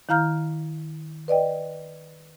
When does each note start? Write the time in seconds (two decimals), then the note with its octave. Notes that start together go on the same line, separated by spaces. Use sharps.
0.09 D#3 E4 F5 A#5 F6 G6
1.28 B4 D5 D#5 G5